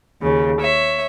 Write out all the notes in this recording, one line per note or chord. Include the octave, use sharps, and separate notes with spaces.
D#2 C#3
C#5 E5